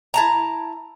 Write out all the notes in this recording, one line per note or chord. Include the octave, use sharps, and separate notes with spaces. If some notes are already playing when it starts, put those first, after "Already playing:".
E4 A5 A#5